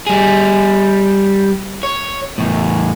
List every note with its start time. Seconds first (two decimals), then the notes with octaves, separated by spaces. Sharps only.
0.07 G3 G#4
1.83 C#5
2.38 E2 A2